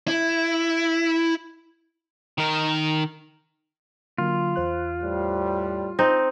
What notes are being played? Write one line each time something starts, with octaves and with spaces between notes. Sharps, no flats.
E4
D#3 A#4
D3 F#3 A#3 F4
E2 C5 F#6
A2 G3
C4 D#4